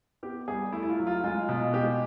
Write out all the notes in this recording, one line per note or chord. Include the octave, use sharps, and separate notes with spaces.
B3 G4
G3 G#4
A3 E4
E4
F4
F#3
F4
G#3 F4
B2
G#3 G4